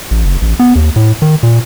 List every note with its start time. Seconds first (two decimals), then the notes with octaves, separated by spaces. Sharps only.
0.11 A1
0.24 F#1
0.42 A1
0.60 B3
0.76 D#2
0.96 A2
1.22 D#3
1.43 A#2